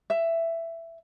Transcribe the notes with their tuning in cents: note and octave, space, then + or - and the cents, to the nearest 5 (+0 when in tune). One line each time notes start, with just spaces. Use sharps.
E5 +10